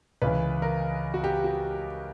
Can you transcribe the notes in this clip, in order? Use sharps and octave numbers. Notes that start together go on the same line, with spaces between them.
C#2 C#3 E3 B4
A#4
F#4
G4
F#4